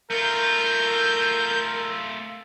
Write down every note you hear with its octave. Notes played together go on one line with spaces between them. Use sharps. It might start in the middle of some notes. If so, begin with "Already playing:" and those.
A3 F4 A#4 G6